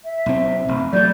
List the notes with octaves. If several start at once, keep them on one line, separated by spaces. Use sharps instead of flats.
E5
B1 C4
F1
F#3 G#3 A3 D5 G6